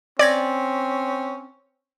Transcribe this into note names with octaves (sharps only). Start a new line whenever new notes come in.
C4 C#4 D5 G#6 A#6